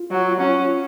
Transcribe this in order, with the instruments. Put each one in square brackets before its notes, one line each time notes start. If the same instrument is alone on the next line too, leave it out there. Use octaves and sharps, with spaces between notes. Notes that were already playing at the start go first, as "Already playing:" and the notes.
Already playing: [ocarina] F4
[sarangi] F#3
C#4